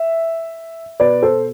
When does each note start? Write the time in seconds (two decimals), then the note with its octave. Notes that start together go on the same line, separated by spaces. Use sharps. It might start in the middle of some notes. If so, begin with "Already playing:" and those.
Already playing: E5
1.00 B2 B4 D5
1.22 A4 C5